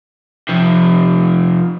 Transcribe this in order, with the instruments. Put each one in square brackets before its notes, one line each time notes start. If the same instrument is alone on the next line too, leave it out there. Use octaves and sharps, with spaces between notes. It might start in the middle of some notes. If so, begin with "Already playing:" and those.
[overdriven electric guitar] F2 C3